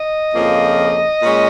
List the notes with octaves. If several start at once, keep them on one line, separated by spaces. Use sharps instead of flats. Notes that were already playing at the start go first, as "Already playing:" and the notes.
Already playing: D#5
F2 C#3 F3 A#3
A#2 G#3 C#4